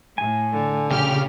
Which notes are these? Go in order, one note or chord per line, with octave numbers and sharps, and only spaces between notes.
A2 G#5
D3
A#1 C#3 G4 F6